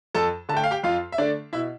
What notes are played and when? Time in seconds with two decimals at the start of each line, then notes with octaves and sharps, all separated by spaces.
0.15 F2 A4 A5
0.49 D3 A5
0.54 A3 G5
0.64 F5
0.71 G4 G5
0.83 F2 F4 F5
1.12 E5
1.18 D3 A3 D4 D5
1.53 B2 E4 E5